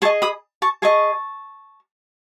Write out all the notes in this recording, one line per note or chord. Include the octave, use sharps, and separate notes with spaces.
G#4 D#5 A5 C#6
B5 D#6
A5 C#6
G#4 D#5 A5 C#6